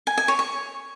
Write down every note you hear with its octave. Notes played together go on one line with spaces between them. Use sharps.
G#5
G#5
C#5
C#6